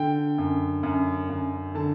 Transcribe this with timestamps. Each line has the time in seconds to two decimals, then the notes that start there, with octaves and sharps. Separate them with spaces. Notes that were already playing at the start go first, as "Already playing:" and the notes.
Already playing: D3 G5
0.38 F#2
0.83 F#2
1.29 F#2
1.74 D3 A5